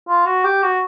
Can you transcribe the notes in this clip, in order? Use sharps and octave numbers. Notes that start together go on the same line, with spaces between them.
F4
F#4
G4
F#4